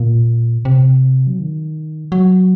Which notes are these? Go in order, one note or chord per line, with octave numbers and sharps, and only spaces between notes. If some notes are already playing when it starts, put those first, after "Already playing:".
Already playing: A#2
C3
F#3
D#3
F#3